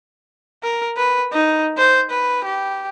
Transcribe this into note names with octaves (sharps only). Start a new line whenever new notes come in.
A#4
B4
D#4
C5
B4
G4